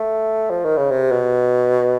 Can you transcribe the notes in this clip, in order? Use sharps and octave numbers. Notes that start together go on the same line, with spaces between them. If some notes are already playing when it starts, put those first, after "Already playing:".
Already playing: A3
F3
D#3
C#3
C3
B2